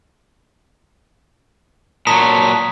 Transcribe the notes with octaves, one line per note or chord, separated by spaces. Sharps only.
A#2 F#3 A5 A#5 D#6 B6